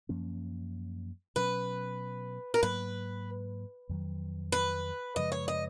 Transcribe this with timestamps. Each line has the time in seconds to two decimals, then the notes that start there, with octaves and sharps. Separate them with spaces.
0.09 F#2 F3 A#3 C#4
1.36 B2 F#3 C#4 B4
2.54 A#4
2.63 G#2 F#3 A#3 B4
3.89 F2 D#3 F#3
4.52 B4
5.16 F#2 C#3 F3 G#3 D#5
5.32 C#5
5.48 D#5